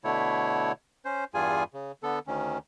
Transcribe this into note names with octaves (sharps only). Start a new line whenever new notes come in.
B2 D3 A3 E4 C#5
C#4 C5
E2 G2 G3 F4 G#4 G#5
C#3
D3 B3 A4
D2 D#3 C#4